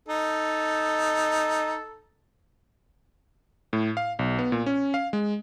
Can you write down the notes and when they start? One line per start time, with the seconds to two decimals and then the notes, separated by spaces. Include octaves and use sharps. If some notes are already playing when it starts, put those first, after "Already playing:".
0.08 D#4 A4
3.73 A2
3.97 F5
4.19 B1
4.39 B3
4.52 A#2
4.66 C#4
4.94 F5
5.13 G#3